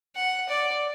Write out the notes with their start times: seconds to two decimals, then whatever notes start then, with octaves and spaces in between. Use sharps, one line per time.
0.16 F#5
0.49 D5